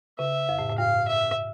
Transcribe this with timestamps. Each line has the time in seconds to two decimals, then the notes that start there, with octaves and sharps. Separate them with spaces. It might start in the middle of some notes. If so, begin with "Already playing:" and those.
0.19 C#3 E5
0.49 F2
0.59 A2
0.69 A2
0.78 G2 F5
1.08 E5